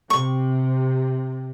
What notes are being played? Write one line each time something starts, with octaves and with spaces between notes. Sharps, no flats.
C3 C#6